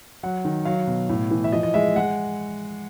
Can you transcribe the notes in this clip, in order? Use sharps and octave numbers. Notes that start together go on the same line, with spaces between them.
F#3 F#5
D#3
F#3 F5
B2
A2
E3
E5
F3 D#5
D#5
G#3 E5
G#3 F#5